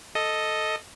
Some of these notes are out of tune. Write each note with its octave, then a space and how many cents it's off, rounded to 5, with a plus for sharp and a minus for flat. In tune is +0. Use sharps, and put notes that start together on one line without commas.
A4 +0 D#5 +0